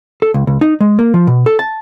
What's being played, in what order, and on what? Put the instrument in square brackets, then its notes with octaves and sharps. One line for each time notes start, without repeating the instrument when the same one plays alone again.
[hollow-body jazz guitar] A4
C#2
C#2
D#4
G#3
A#3
F3
B2
A4
A5